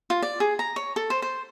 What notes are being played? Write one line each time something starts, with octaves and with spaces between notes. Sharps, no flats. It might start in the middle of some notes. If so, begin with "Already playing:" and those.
F4
D5
G#4
A#5
C#5
A4
C5
C5